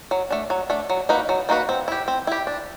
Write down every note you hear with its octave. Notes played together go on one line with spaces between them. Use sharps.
F#3
A3 D4
F#3
A3 D4
F#3
A#3 D#4 F#4 B4
F#3
A#3 D#4 F#4 B4
C4
E4 G4
C4
E4 G4
D4